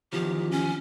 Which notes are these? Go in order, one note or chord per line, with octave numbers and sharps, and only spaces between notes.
E2 D#3 F3 G4
C#4